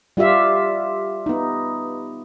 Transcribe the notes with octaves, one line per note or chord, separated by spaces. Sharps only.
G3 F4 G4 E5 F5
B3 D#4